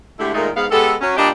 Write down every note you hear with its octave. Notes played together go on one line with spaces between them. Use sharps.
D3 G#3 A3 E4 G4
A#2 D#3 G#3 A3 D#4 A#4
G#2 B3 F5
G#3 B3 G4 A4
F#3 C#4
A#2 G3 D4 G4 D#5